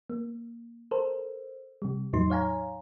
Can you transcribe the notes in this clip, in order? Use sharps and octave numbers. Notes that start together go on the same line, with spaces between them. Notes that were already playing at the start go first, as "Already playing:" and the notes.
A#3
A4 A#4 C5
C3 G3
E2 A2 F#3 D#4 C6
C#5 F5 G#5 A#5